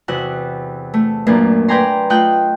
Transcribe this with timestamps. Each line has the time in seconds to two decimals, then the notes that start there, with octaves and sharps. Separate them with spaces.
0.08 E2 C3 F#4 F#6
0.94 A3
1.26 F#2 A#2 A#3 B3 D4
1.68 B4 D5 G5 G#5 A#5 C6
2.10 A3 F4 D#5 G5 F#6